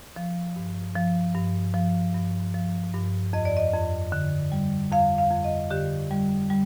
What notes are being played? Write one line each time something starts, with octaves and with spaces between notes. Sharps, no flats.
F3
G2
F3
G2
F3
G2
F3
G2
F2 D#5
D5
D#5
F2
D3
G3
F2 F5
F5
F2
D#5
D3 G4
G3
G3